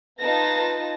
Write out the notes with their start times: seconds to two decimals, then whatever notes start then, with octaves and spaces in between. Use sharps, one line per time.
0.20 D#4 F4 B4 A5 A#6